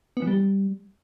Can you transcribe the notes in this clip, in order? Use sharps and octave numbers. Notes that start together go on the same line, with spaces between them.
B3
E3
G3